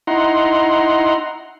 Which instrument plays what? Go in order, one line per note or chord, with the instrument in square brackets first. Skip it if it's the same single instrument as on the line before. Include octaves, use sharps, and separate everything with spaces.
[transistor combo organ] D#4 E4 F#5 A#5 C6